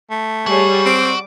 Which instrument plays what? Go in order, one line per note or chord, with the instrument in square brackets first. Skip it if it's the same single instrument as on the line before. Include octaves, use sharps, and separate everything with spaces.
[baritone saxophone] A3
[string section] G3 [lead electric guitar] F#4 [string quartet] G#4 C#5
[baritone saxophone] C4 [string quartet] D6